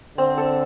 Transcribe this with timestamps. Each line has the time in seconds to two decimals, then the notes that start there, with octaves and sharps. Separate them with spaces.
0.18 D3 C4
0.38 A4